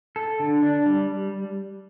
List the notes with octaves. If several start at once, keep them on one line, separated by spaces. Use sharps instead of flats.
A4
D3
D4
G3